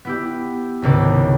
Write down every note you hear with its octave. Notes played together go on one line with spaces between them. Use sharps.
B3 E4 G4
G#1 C#2 C3 D6